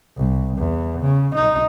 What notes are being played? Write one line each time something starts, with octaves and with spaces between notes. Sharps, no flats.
C2
E2
C#3
D#4